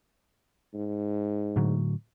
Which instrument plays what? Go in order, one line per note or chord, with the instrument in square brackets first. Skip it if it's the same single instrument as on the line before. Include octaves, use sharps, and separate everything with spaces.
[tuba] G#2
[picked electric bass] A2 D3 F#3